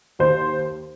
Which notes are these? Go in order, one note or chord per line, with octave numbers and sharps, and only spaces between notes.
D#2 C5